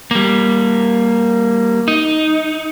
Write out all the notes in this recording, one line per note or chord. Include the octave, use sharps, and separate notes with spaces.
G3 A#3
D#4